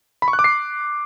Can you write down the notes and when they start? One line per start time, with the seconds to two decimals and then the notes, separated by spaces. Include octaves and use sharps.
0.22 B5
0.28 C#6
0.33 F#6
0.39 D6
0.44 C7